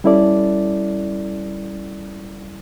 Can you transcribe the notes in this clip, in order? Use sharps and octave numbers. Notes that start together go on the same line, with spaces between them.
G3 C#4 E4 A4 D5